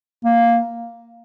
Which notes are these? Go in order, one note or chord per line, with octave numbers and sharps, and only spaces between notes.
A#3